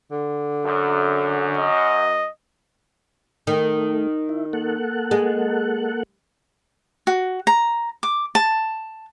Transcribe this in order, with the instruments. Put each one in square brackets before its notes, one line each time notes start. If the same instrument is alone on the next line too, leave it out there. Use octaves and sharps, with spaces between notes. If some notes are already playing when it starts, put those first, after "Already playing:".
[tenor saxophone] D3
[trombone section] F#2
[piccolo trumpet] D#5
[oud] D#3 [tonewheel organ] A3
[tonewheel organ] E4
A#3 A4 F#5
[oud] G#3
[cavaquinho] F#4
A#5
D6
A5